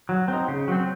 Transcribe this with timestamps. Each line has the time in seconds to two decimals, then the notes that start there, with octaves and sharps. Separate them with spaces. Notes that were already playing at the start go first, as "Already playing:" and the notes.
0.09 F#3
0.28 C4 D#4
0.48 C#3
0.68 F#3 C4